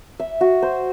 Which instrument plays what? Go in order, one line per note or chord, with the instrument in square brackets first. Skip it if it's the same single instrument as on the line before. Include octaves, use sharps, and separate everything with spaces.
[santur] E5
F#4
C5